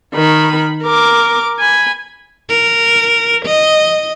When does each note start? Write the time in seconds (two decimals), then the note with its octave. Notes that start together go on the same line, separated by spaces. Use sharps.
0.14 D#3 B5
0.83 A#4 D6
1.60 G#5 B5
2.49 A#4
3.46 D#5